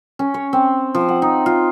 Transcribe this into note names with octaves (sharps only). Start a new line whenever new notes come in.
C#4
C#5
C4
F3
F#5
D#4
F4